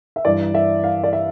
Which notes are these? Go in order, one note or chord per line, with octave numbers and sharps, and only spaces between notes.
E5
G2 E3 D5
E5
F5
D5
E5